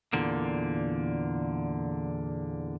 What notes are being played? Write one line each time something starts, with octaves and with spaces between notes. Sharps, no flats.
E2 A#2 D3 A#3